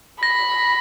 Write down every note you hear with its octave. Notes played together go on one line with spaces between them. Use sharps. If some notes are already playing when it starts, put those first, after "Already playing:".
B5 A#6